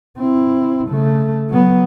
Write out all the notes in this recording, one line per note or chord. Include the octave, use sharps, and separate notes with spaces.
C4 E4
C#3 A3
F#3 B3